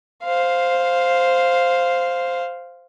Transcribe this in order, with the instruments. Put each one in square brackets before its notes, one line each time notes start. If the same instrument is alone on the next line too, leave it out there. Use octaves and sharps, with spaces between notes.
[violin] C5 F5